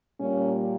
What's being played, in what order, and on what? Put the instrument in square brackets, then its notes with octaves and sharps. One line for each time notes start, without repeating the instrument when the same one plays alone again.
[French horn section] A#2 G3 A#3 C#4